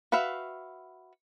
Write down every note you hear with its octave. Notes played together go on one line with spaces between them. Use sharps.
F#4 B4 E5 F5